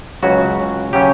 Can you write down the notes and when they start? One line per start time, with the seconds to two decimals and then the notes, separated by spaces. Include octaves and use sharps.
0.23 C#2 C#3 F#3 C#4 F#4
0.93 C#3 F#3 C#4 G4